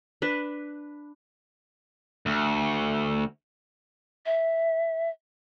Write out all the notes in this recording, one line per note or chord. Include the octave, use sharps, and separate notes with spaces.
D4 B4
D2
E5